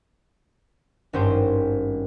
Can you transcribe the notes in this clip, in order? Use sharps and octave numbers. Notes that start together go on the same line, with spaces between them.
G#1 G2 C#4 G4 C5